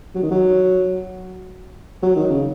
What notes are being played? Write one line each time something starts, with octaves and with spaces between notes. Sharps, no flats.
F#3
D#3
F#3
F#3
D#3
C#3